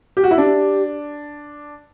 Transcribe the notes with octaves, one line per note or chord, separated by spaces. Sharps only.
G4
F#4
E4
D4 G4